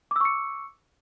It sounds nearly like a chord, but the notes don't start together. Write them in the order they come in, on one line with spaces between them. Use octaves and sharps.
D6 E6 C#6 C#7